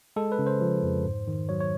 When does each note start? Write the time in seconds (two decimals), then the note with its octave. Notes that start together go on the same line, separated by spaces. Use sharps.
0.16 G#3 A4
0.32 B4
0.39 C#3
0.47 C5
0.61 F3
0.83 F2
1.04 G#2
1.28 D#3
1.49 F#3 C#5
1.60 C#5